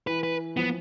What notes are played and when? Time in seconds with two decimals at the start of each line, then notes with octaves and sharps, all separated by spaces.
0.07 E3 B4
0.23 B4
0.57 F3 B3